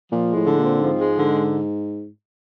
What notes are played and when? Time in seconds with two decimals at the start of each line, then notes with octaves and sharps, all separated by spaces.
0.12 A#2 F3
0.30 G#3
0.36 A2
0.47 D3
0.58 A#2
0.64 C4
0.82 G#2 F3
1.00 G#3
1.17 D3